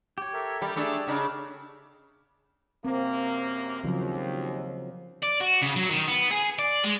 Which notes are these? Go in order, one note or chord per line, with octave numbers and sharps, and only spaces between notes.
G4 C#5
A4 A#4 E5
G3 G4
A3 D4 G#4 D5 E6
C#3 D4 D#4
F#2 C3 A#3 C4
D#2 C#3 F3 F#3
D5
F#4
C#3
F#3
D#3
B3
G#4
D5
G#3